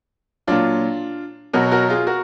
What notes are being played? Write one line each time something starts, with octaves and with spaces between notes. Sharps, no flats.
A#2 F#3 D4 F4
B2 F#3 F#4 A#4
F#4 A#4
F4 G#4
F#4 A#4